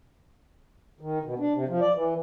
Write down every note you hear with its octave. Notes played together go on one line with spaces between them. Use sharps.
D#3
B2
D4
C3
F3
D5
E3